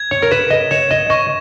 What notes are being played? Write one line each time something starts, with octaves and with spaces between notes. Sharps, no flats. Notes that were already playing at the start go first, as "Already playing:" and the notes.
Already playing: G#6
C#5
A#4
B4 E7
D#5
C#5 E7
D#5
D#5 C#6